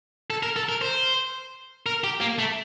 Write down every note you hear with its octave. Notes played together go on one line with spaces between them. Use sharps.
A4
A#4
A4
A#4
C5
A#4
G4
A#3
A3